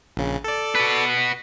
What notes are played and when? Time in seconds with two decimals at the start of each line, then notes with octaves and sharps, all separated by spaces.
0.17 A#1 C#3
0.44 A4 D5
0.75 F#4 B4